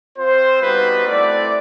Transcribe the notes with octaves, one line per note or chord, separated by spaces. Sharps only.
C4 F4 C5
G3 B3 D#4 F#4 B4
A3 C4 E4 D5